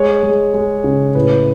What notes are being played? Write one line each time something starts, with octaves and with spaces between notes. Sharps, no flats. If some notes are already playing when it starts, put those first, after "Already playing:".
Already playing: G#3 C#5
G#3
G#3
C#3
A2 B4